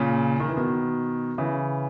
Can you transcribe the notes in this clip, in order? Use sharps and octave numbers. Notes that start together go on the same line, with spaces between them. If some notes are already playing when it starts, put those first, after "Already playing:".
Already playing: A#2 C#3
D#3
E3
B2 D#3
C#3 E3